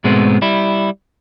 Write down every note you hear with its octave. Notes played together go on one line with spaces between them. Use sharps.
G#2 B2 G#3 A3 B3 C4
G3 E4